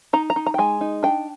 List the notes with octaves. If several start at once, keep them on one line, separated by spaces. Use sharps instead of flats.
D#4 A#5
A#5
D#4
A#5
G5
G#3 G#5
D#4
D4 G5